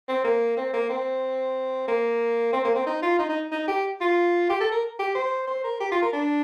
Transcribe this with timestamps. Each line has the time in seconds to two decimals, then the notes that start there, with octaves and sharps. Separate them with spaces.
0.08 C4
0.24 A#3
0.57 C4
0.73 A#3
0.89 C4
1.88 A#3
2.53 C4
2.64 A#3
2.75 C4
2.86 D#4
3.02 F4
3.19 D#4
3.29 D#4
3.51 D#4
3.68 G4
4.01 F4
4.49 G4
4.60 A4
4.72 A#4
4.99 G4
5.15 C5
5.47 C5
5.64 A#4
5.80 G4
5.91 F4
6.02 A#4
6.13 D4